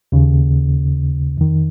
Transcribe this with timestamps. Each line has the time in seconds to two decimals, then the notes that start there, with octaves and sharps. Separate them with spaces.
0.12 D#2 C#3
1.37 F2 D#3